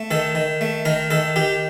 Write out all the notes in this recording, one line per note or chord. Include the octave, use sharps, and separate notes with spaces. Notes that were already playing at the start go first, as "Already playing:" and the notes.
Already playing: A3
D#3 A4
D#3
A3
D#3 A#4
D#3 A4
D#3 G4